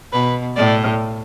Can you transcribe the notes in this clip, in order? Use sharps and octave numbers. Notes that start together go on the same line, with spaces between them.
B2 B4
A2 D5